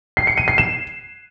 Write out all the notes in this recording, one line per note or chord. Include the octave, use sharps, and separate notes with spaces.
C7
C#7
D#7
C7
E7